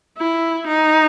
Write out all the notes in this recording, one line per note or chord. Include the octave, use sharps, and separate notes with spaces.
E4
D#4